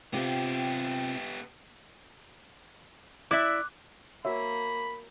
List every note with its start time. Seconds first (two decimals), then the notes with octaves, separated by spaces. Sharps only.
0.13 C3 B3 F4 G4
3.31 E4 D5 E5 D6 F#6
4.25 A#3 F#4 C#5 E5 B5